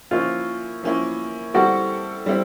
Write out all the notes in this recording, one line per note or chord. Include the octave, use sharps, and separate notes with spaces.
F3 A#3 C#4 E4 F4
F3 A#3 C#4 E4
G3 C4 E4 F#4 A4
G3 C4 E4